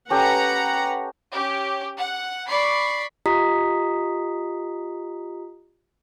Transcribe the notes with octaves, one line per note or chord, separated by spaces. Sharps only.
C#4 G4 A4 B4 F#5 A#5
C#4 G4
F#5
D5 B5 C#6 C7
F4 G4 D#5 A#5 D#6 B6